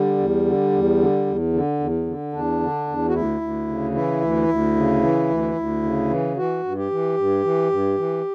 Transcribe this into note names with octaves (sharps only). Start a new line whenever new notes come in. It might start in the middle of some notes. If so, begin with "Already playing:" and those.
Already playing: D3 G3
E2
D3
E2
D3
E2
D3
E2
D3
E2 D4
D3
E2
F#4
D2 E4
D2
C#3
E3 E4
D2
D2
C#3
E3
D2
D2
C#3
E3
E3 F#4
G2
G4
E3
G2
E3
G2
E3